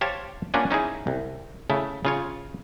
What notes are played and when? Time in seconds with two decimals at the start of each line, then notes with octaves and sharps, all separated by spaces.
0.01 G4 C5 C#5 F5 A5
0.54 A#3 C#4 D4 F4 F#5 G#5
0.71 C#4 D#4 E4 G#4
1.07 C2
1.70 C#3 A3 E4
2.05 C#3 F4 C#5